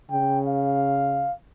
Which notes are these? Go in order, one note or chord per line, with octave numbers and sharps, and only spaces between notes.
C#3 G5
F5